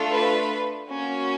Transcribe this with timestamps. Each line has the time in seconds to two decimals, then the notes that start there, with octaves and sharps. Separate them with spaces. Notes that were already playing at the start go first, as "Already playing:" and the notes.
Already playing: A3 D4 F4 A4
0.11 B4
0.89 A#3 C#4 F#4